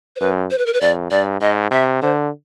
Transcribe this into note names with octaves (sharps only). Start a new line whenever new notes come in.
C5
F#2 B4
C5
B4
A#4
B4
F2 D5
G2 D5
G#2 D#5
C3 E5
D3 C5